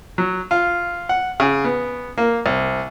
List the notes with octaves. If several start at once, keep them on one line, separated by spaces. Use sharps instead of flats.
F#3
F4
F#5
C#3
B3
A#3
C2